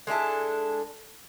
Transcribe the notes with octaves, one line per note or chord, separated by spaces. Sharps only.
G#3 D4 E4 A4